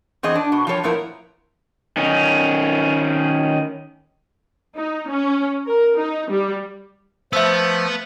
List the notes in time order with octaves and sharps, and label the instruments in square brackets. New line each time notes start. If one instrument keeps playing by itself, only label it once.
[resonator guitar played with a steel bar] E2 C4 G#4 D#5
D4
B2
F3 G3 F4 A4 C#5
A#2 F3 B3 E4 A#4
[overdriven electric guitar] D#3 C#4
[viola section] D#4
C#4
A#4
D#4
G3
[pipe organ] F3 A3 [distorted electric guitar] B3 [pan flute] C5 [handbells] E5 E6